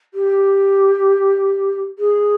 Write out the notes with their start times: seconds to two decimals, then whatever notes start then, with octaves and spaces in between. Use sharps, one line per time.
0.14 G4
1.99 G#4